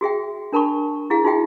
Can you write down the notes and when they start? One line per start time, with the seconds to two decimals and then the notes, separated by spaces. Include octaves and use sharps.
0.01 F#4 G#4 E5 G5
0.52 D4 A#4 A5 B5 C#6
1.10 E4 G#4 F5
1.24 D#4 F4 F#4 G#4 E5 G5